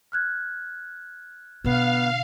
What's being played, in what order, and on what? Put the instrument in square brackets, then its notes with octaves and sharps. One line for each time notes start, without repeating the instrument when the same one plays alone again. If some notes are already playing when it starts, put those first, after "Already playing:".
[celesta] F6 F#6 G#6
[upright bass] B2 D3 [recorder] B3 [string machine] F5